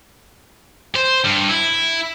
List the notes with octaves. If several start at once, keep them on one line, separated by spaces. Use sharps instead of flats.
C5
G2
E4